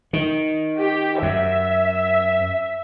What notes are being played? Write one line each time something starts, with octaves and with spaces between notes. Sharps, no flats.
D#3
G4
F#2 E5